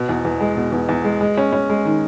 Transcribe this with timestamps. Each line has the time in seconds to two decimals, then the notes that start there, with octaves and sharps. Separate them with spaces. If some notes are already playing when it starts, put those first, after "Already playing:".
Already playing: B2
0.09 E2
0.25 E2
0.40 G#3
0.56 B2
0.72 E2
0.89 E2
1.04 G#3
1.21 G#3
1.37 C#4
1.53 C#4
1.70 G#3
1.85 D#3